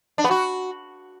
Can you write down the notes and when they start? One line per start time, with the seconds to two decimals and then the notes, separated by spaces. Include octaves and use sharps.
0.18 D4
0.24 B3
0.31 F#4